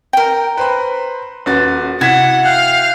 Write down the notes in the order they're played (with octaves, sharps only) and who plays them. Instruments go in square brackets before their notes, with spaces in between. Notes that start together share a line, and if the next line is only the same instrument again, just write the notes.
[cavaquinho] A#4 G5
[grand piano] B4 C5 B5
[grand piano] D#1 F#4 A6 [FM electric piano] C#4 B4
[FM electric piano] C3 [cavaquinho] E4 F#4 [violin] F#5 [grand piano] G#6 B6
[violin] F5 [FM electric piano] G5 F#6 G6